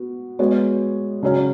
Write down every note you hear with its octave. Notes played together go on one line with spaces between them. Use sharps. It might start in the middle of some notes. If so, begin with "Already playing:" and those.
Already playing: B3 F#4
G#3 B3 F#4 C#5
C#3 F#3 C#4